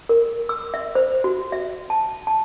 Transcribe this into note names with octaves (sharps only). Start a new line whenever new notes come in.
A#4
E6
E5
C5
F#4
E5
A5
A5